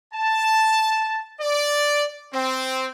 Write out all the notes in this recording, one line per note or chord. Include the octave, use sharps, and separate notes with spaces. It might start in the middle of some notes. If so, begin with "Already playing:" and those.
A5
D5
C4